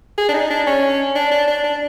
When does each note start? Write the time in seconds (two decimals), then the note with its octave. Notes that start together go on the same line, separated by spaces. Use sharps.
0.18 G#4
0.29 D4
0.34 D#4
0.50 D4
0.67 C#4
1.16 D4
1.32 D4
1.48 D4
1.64 D4